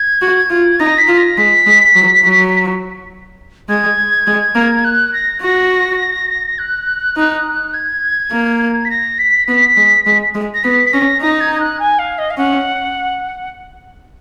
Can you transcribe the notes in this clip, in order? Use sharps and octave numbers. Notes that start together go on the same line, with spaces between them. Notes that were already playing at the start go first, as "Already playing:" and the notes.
Already playing: G#6
F#4
F4
D#4 A#6
B6
F4
A#6
G#3 B6
G#3
F#3
F#3
G#3 G#6
G#3
A#3
F#6
A#6
F#4 A#6
F#6
D#4
G#6
A#3
B6
A#6
B6
B3 B6
G#3
G#3
G#3
A#6
B3 B6
B6
C#4 A#6
D#4 A#6
G#6
G#6
F#6
G#5
F5
D#5
F5
C#4 F#5